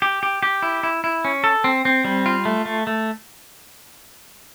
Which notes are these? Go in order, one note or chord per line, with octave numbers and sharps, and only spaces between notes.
G4
G4
G4
E4
E4
E4
C#4
A4
C4
C4
G3
F4
A3
A3
A3